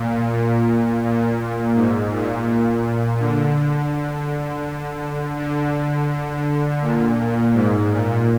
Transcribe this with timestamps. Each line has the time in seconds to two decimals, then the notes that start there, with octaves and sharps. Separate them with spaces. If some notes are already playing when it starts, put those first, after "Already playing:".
Already playing: A#2
0.29 A#2
1.02 A#2
1.74 G#2
2.11 A#2
3.20 D3
5.37 D3
6.81 A#2
7.18 A#2
7.54 G#2
7.91 A#2